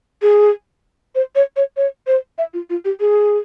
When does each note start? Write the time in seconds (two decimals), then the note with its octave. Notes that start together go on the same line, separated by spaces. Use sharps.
0.22 G#4
1.15 C5
1.35 C#5
1.57 C#5
1.77 C#5
2.07 C5
2.38 E5
2.54 F4
2.70 F4
2.85 G4
3.00 G#4